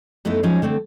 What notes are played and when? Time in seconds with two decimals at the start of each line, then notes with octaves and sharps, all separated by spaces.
0.25 F#2 A3 B3 D#4 E4
0.43 F3 F#3 G#3 C#4 D#4
0.62 D3 A3 C4